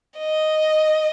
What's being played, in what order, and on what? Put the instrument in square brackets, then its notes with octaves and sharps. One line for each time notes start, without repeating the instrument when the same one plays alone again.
[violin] D#5